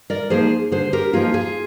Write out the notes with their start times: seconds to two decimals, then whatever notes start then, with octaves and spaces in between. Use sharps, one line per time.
0.10 A#4 D5
0.30 F3 A#3 D#4 G#4 C5
0.71 D3 G#4 C5
0.93 G4 A#4
1.13 F3 A#3 D#4 F4 G#4
1.34 F4 G#4